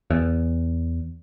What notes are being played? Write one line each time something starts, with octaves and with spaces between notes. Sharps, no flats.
E2